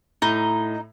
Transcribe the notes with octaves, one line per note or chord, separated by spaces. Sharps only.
A2 D#4